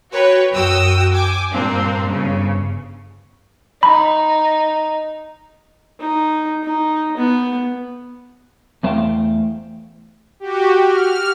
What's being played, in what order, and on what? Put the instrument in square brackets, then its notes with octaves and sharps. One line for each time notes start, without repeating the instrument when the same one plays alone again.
[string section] F#4 B4 C#5 G5
F#2 F#4 G5 D#6 E6
G5 G#5 D6
G2 A#2 A#3 C4 D4
G1 G2 C#3
[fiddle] D#4 [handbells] B5
[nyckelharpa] D#4
D#4
B3
[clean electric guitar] E2 A3 C5 F5 G5
[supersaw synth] F#4 G4
F6